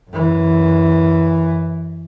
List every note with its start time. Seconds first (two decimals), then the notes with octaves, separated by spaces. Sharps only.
0.10 F#2 E3